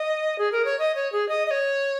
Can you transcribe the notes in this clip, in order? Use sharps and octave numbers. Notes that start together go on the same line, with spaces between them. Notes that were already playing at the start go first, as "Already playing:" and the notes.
Already playing: D#5
G#4
A#4
C#5
D#5
C#5
G#4
D#5
D#5
C#5